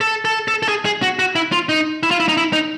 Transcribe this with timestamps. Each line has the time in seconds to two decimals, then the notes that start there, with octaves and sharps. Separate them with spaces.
0.01 A4
0.25 A4
0.48 A4
0.63 A4
0.68 G#4
0.85 G#4
1.02 F#4
1.19 F#4
1.36 E4
1.52 F4
1.69 D#4
2.03 E4
2.11 F4
2.20 E4
2.29 D#4
2.37 E4
2.53 D#4